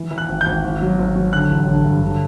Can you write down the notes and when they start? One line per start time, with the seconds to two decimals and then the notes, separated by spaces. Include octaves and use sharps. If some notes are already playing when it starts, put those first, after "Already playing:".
Already playing: E3
0.11 E3
0.18 F#6
0.28 G#1
0.41 G6
0.46 G#1
0.64 G#1
0.81 F#3
0.98 G#1
1.16 F#3
1.32 D3 F#6
1.50 A1
1.67 D3
1.84 G2
2.03 D3